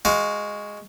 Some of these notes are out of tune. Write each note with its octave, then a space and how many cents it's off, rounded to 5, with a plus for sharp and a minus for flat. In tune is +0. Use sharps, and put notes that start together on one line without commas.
G#3 +0 F#4 +0 F5 +30